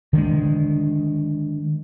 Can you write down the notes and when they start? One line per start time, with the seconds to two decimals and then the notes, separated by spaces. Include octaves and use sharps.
0.13 D3 D#3 G3 G#3